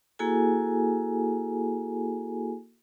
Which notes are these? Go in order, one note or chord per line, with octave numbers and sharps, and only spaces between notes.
A#3 E4 F#4 G#4 A4 G#5